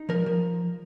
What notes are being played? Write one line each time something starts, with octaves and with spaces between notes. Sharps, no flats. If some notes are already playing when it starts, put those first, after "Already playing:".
Already playing: D#4
F3 A#4
F3